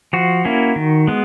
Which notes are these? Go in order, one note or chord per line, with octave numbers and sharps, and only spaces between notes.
F3 F#4
A#3 C#4 E4
D#3
G#3 B3